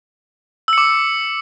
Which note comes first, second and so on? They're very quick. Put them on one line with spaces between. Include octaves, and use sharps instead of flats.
E6 C#7 D6